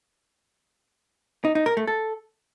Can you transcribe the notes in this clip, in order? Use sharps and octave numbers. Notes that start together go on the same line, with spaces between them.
D#4
D#4
A#4
A3
A4